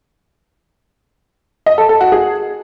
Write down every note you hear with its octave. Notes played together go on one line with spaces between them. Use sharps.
D#5
A4
A4
F#4
G#4